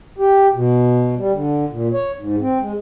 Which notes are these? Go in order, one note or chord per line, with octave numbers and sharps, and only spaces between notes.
G4
B2
G3
D3
A#2
C#5
G#2
C4
G#3